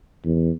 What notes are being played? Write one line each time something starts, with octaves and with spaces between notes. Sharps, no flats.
E2